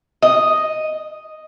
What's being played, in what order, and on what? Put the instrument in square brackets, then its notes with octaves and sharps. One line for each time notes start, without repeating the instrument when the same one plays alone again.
[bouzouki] D#5